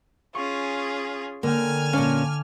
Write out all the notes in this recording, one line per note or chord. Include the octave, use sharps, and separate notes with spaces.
C#4 F4 G#4 C#6
D3 A#3 C#4 G5 G#5 F6
A#2 C#4 F5 A5 D6